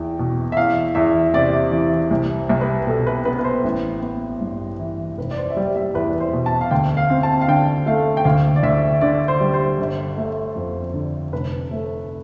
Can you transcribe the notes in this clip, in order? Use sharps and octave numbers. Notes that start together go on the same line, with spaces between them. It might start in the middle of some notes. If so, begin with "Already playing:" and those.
Already playing: E2 G5
B2
E5
E2 F5
E2 E5
C3 D5
E3
C2
C2
B4
B2 A4
B4
B3 B4
B4
C5
A1
B3
G2
E3
F1 B4
D5
C5
E5
G3 D5
E5
E2 B4
C5
B2
A5
F5
D2 G5
F5
C4
A5
F5
D3 G5
A3 F5
G5
D2 F5
D5
D2 E5
D3 D5
C5
G3
C5
G1
A3
F2
D3
F1 B4
A3